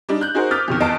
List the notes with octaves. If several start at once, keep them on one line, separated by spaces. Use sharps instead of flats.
G3 D4 D#4
F#6 G6
D#4 F#4 G#4 A#4 C5
D6 D#6 F6 G6 A6 B6
F2 B2 D#3
G1 E2 D#5 A5 C7 D7